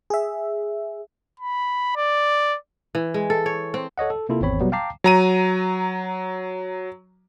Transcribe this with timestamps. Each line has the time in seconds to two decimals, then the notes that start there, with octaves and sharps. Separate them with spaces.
0.10 G#4 E5
1.40 B5
1.96 D5
2.95 E3
3.14 G#3
3.30 A4
3.46 C#5
3.74 C4
3.98 A4 C#5 D#5 F#5
4.10 A4
4.29 C3 A#3 E4 F4 A4
4.41 G#1 E2 C4 C#5 B5
4.60 B2 F#3 G3 B3
4.72 F5 G5 A5 A#5 D6 C7
5.04 F#3 A#5 D#7